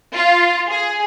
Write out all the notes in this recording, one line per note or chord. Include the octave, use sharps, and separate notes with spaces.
F4
G#4